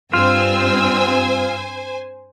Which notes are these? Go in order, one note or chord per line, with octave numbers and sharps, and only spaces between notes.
G2 C4 F4 C5 G#5 E6